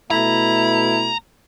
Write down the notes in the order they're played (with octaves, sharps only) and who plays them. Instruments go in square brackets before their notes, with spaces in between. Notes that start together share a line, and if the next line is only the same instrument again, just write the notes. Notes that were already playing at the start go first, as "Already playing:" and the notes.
[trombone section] B2 A3 [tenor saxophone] E4 [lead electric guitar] A#5